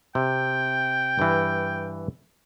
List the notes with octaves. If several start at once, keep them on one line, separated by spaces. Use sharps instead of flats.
C3 G5
G2 E3